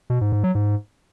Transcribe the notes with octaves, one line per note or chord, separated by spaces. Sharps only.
B2
G#2
G#2
F#3
G#2